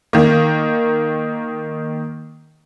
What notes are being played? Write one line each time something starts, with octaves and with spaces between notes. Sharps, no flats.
D#3 A#3